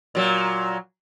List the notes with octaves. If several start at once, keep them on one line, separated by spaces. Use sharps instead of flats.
A#2 F#3